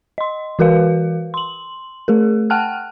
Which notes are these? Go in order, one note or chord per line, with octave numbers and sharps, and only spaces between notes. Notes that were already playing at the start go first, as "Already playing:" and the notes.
D#5 C6
E3 F#4 A#4 B4 F5
C6 F#7
A3 G#4 A#4
F#5 G5 A5 F6 F#6